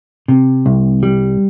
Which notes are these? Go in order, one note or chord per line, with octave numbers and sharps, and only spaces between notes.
C3
C2
G3